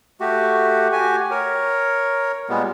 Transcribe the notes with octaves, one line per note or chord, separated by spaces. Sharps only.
A3 F#4 G4
F#4 G4 G#5
A#4 C#5
A#2 G3 G#3 B3